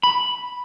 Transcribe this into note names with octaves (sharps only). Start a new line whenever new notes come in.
B5